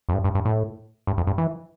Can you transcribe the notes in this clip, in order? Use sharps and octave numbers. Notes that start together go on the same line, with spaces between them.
F2
G2
G2
G2
A2
G2
F2
G2
E3